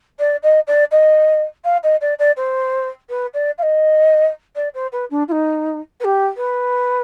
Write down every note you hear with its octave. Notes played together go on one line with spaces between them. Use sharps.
D5
D#5
D5
D#5
F5
D#5
D5
D5
C5
B4
D5
F5
D#5
D5
C5
B4
D4
F4
D#4
B4
G4
B4